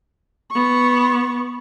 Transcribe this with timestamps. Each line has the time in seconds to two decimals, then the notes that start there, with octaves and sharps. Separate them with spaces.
0.51 B3 C#6